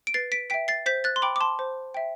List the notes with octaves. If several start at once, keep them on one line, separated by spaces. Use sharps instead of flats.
D7
B4 A6 C7
B6 D7
E5 G5 B6 D7
A6 C7
C5 G6 B6
F#6 A6
C6
G5 B5 D6
D6
A5 C6
C5
E5 G5